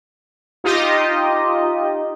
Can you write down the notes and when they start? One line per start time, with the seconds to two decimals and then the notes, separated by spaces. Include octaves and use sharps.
0.64 D#4 F4 G4 D#5